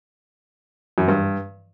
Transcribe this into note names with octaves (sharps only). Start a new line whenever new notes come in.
F#2
G2